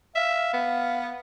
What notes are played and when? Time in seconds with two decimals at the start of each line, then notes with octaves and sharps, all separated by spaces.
0.15 E5 F5
0.53 B3